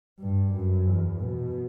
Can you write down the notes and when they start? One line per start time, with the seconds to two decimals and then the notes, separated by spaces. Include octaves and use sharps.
0.20 G2
0.54 F#2
0.89 E2
1.23 B2